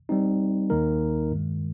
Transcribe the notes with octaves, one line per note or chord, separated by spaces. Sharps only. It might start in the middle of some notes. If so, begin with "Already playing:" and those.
G3 C4 D#4
D#2 D#3 A#3 D#4 A#4
G2 D#3 G#3